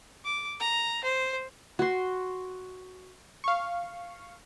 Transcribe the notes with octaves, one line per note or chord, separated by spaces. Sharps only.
D6
A#5
C5
F#4 C6
F5 C#6